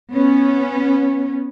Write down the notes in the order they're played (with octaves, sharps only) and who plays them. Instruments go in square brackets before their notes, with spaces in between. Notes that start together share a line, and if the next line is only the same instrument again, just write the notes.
[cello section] B3 C#4